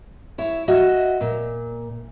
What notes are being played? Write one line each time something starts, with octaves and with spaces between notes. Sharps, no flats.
E4 C#5
F#4 D#5 E5
A#2